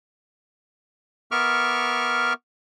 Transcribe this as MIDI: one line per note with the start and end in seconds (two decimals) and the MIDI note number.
1.31 2.33 59
1.31 2.33 70
1.31 2.33 76
1.31 2.33 85
1.31 2.33 86
1.31 2.33 89